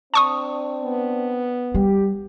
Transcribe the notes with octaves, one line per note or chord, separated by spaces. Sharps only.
C4 D4 A5 C#6 D#6
B3
G3 G4